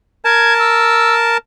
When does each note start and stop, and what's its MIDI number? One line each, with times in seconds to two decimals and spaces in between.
0.25 1.37 70
0.25 1.37 81
0.25 0.54 92
0.59 1.14 88